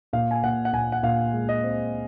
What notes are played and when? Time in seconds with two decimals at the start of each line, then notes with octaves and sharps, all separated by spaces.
0.13 A#2 F5
0.31 G#5
0.43 A#2 F#5
0.65 F#5
0.73 A#2 G#5
0.92 F#5
1.03 A#2 F5
1.33 G#3
1.49 D#5
1.64 C4